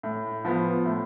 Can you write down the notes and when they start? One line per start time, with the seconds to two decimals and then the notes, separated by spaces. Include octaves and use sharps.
0.03 A2
0.45 F3 B3
0.86 A2